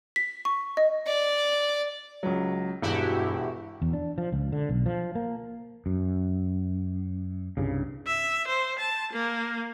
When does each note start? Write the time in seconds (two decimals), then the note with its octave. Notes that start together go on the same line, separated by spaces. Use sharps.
0.16 B6
0.45 C#6
0.77 D#5
1.06 D5
2.23 C#2 F#3
2.82 E1 G2 E4 F#4 G4
3.82 E2
3.93 D4
4.18 F3
4.32 C#2
4.52 D3
4.69 B1
4.86 F3
5.15 A#3
5.86 F#2
7.57 C2 G2 C#3
8.07 E5
8.48 C5
8.79 A5
9.13 A#3